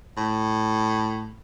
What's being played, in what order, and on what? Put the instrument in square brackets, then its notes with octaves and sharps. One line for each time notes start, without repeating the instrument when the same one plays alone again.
[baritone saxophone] A2